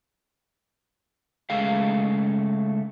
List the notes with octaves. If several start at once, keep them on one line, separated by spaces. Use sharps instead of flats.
C#3 G#3 A3 G#4 F5